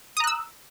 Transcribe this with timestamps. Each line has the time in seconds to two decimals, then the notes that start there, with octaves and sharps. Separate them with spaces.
0.17 D#6
0.20 A#5
0.24 F#6
0.27 E6